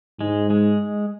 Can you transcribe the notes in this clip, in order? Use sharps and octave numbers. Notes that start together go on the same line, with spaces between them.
G#2 G#3
G#3